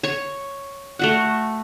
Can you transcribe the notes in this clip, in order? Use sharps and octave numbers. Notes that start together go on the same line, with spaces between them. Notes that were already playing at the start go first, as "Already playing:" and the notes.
C#5 C#6
A3 F#4 F#5